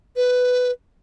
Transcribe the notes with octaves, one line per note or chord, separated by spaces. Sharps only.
B4